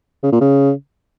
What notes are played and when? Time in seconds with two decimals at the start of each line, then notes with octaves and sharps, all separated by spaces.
0.23 C#3
0.32 A#2
0.41 C#3